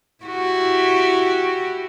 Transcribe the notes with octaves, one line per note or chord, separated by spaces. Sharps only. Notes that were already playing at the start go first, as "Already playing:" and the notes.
E4 F#4 G4